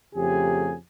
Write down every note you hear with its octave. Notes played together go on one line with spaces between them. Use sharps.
F2 C#3 A3 G4 G#4 G#5